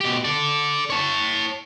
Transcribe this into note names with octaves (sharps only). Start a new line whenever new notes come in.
B2 G4
A4 D5
C#5 A5